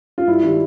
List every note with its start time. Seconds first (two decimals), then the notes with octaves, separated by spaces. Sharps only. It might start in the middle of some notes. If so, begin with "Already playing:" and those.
0.18 F4
0.27 G2 E4
0.43 D#3 G3